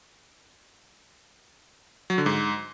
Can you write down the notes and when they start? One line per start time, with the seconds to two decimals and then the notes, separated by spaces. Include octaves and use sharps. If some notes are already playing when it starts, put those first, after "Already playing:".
2.10 F#3
2.18 D3
2.26 G#2